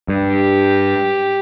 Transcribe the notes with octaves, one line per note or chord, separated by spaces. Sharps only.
G2
G4